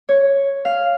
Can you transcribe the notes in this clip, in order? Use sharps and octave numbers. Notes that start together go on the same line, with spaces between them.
C#5
F5